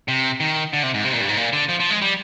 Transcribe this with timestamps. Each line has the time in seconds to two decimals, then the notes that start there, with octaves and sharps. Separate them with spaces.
0.08 C3
0.40 D#3
0.73 D3
0.83 C3
0.94 G#2
1.04 C3
1.13 A#2
1.21 G2
1.29 G#2
1.37 A#2
1.53 D3
1.69 F3
1.80 F3
1.90 G#3
2.02 G3